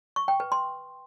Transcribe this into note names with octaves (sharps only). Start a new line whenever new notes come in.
C#6
G5
B4
C6